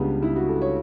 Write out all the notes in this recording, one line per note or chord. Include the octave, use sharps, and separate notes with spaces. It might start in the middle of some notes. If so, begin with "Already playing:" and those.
Already playing: C#2 C#3 G3 B3 D4
E4
F#4
A4
C#5